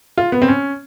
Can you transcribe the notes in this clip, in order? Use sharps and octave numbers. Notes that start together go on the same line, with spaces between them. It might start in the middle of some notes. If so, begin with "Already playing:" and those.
F4
B3
C4
C#4